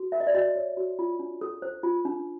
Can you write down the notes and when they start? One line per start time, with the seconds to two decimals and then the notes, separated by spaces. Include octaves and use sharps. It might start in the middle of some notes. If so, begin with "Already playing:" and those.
Already playing: F#4
0.12 A#4 E5
0.20 D#5
0.27 D5
0.34 F#4 D#5
0.56 C#5
0.77 F#4
0.99 F4
1.19 D4
1.41 A4
1.62 C5
1.83 F4
2.05 D4